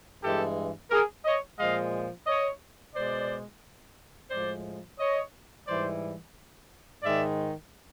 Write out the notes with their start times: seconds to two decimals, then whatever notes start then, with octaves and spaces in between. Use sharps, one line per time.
0.23 G2 E3 G#3 G4 A4
0.91 G#4 A#4
1.25 C#5 D#5
1.59 A#2 F3 G#3 D#5 F5
2.27 C#5 D#5
2.95 B2 G#3 C5 D5
4.31 A2 F3 G#3 C5 D5
4.99 C#5 D#5
5.67 G#2 E3 G3 C5 D5
7.03 G#2 D#3 G#3 D5 E5